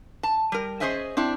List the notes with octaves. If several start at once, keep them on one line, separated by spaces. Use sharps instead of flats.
A5
G3 A#4
C#4 G#4 C5 D#5 E5 G#5
C4 D4 E4